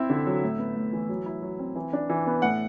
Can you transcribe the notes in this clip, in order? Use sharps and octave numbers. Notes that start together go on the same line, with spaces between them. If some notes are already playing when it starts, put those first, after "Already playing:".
Already playing: C4 E4 E5
D3
F#3
A2
B3
A2
E3
F#3
E4
F#3
C4
E3
D4
E3
B3
A2 F#5